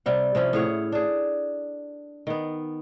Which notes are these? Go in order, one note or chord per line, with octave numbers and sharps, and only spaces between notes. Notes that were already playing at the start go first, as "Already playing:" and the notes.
C3 G3 F#5
C3 F3 C#4 E4
A2 G#4 C#5 F#5
D4 G#4
D#3 B3